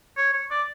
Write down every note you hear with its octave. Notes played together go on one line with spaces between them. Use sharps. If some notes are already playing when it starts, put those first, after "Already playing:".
C#5
C#5
D5